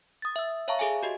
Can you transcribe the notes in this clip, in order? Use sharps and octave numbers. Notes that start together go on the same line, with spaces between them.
D#6 A6
E5 E6
C#5 E5 F5 A5 A#5 C#6
G#4 A4 E5 G#5
F#4 G4 D#5